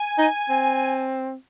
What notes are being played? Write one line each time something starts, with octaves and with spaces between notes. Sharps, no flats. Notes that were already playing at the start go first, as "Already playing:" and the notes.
Already playing: G#5
D#4
C4